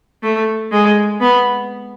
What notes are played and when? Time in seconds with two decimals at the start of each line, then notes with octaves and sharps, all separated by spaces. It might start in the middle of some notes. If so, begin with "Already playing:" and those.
0.23 A3
0.72 G#3
1.21 B3